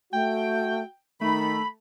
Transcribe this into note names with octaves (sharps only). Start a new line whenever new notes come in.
A3 F#4 G5
D#3 A3 D#4 B5